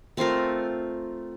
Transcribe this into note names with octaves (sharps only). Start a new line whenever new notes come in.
A3 C4 F4 A#4